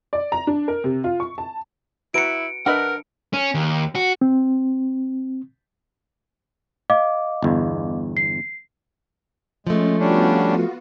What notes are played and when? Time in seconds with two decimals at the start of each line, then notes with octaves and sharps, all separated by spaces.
0.13 D5
0.32 A#5
0.47 D4
0.68 A#4
0.84 C3
1.04 F4
1.20 C#6
1.38 A5
2.14 E4 F#4 B4 A#5 C#7 D7
2.66 D4 A#4 B4 D#5 E5 F#5 B5
3.33 C#4
3.54 D#2
3.95 F#4
4.21 C4
6.90 D#5 F5 D6
7.43 G1 E2
8.17 C7
9.67 F3 G#3 A3 C#4
9.99 G3 B3 C#4 D4 F4 F#4